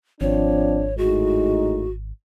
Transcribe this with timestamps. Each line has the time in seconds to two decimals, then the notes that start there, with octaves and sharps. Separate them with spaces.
0.21 G#1 F3 C4 D4 C#5
0.98 A2 G#3 D#4 F#4